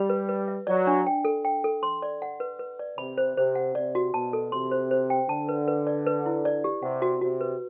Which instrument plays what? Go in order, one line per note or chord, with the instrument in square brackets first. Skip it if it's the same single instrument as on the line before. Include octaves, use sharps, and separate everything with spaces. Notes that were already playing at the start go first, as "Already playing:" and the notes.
Already playing: [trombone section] G3 [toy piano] B5
[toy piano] B4
B4
E5
[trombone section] F#3 [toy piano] D5
[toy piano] D4
G5
A4
G5
A4
C6
D5
F#5
B4
B4
D5
[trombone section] C3 [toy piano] B5
[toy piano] C5
[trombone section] C3 [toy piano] C5
[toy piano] F#5
[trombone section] C3 [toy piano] D5
[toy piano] F#4
[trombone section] B2 [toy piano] A5
[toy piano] A4
[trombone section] C3 [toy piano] C6
[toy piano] C5
C5
G5
[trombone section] D3 [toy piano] A5
[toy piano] B4
B4
D5
B4
E4
D5
G4
[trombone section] C3 [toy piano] F#5
[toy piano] F#4
[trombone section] C3 [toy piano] F#4
[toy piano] B4